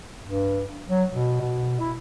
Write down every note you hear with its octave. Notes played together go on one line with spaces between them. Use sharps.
G2
F#3
B2
B2
E4